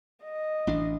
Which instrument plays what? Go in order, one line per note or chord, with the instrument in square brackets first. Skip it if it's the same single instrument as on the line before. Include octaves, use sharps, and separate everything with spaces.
[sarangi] D#5
[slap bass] A1 E3 D4